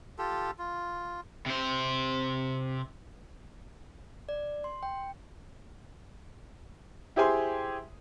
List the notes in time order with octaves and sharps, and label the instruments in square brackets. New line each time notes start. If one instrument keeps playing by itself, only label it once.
[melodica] F4 G4 A4
F4
[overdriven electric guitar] C3 C5
[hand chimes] D5
C6
G5
[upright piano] E4 G4 G#4 C5 G#5 C6